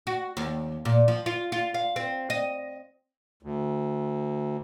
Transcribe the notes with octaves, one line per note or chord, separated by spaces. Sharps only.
F#4
D#2
A#2
F3
F4
F4
F5
C4
D#5
D2